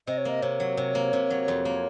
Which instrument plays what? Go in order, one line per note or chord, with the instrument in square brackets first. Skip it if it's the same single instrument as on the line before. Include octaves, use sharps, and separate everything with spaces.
[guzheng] C3 [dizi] D#5
[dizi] C#5
[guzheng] A#3 [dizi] D#5
[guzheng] C3 [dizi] C#5
[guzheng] F#3
C3
A#3
C3
F#3
F2
A#3